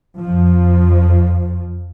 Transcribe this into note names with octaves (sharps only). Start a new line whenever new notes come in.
F2 F3